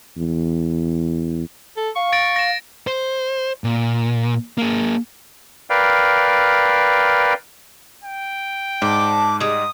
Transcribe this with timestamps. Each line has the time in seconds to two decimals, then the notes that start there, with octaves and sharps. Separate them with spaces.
0.17 E2
1.77 A4
1.96 F5 C#6
2.13 A6 A#6 D7
2.36 A#6 E7
2.87 C5
3.64 A#2
4.58 A#3 G#4
5.70 A#4 B4 D5 F5 G5
8.04 G5
8.82 G#2 D4 D6
9.40 G3 G#3 D#6